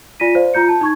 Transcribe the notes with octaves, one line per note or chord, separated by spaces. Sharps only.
F4 D5 G#5 A#6 B6 D#7
C5 D5 F5
F4 A#5 G6 C#7
A5 G6
D#4 C#6 G#6